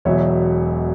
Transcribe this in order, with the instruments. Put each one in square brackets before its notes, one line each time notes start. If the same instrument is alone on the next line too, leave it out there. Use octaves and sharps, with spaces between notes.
[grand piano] E1 E2 B2 F#3 C#5 E5